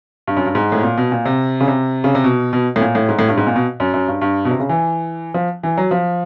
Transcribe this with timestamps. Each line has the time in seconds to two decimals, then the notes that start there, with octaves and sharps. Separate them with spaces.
0.27 G2
0.37 F#2
0.46 G2
0.55 G#2
0.72 A2
0.83 A#2
0.97 B2
1.12 A#2
1.25 C3
1.61 C#3
1.68 C3
2.04 C#3
2.15 C3
2.24 B2
2.53 B2
2.76 A2
2.81 A#2
2.95 A2
3.09 G#2
3.19 A2
3.28 G2
3.37 G#2
3.47 A#2
3.56 B2
3.80 F#2
3.94 F#2
4.08 G2
4.21 G2
4.45 B2
4.51 C3
4.60 C#3
4.69 E3
5.34 F3
5.63 E3
5.77 F#3
5.91 F3